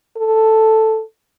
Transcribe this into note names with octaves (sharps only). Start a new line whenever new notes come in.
A4